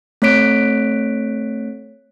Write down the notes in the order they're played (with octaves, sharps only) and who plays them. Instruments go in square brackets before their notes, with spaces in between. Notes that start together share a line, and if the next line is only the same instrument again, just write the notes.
[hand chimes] A3 C4 C#5 F#6 B6 D7